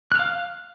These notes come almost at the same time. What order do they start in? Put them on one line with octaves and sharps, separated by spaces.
F#6 F6 F5